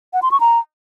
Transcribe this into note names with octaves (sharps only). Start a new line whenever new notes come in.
F#5
C6
C#6
A#5